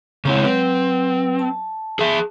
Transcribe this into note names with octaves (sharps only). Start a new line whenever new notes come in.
C#3 G#3 C4 E4 C#5
F#3 C4 B4
A5
G#4 E5